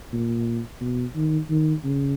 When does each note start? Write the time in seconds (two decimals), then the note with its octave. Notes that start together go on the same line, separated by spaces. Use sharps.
0.13 A#2
0.81 B2
1.15 D#3
1.50 D#3
1.84 C#3